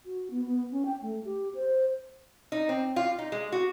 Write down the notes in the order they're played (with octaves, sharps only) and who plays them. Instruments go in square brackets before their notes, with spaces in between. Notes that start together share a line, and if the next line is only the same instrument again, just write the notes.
[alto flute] F#4
B3
B3
C#4
G5
A3
G4
C5
[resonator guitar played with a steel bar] D#4
C4
F4
D#4
G#3
F#4